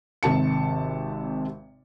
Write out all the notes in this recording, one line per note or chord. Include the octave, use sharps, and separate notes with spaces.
G#1 C3 A5 C#7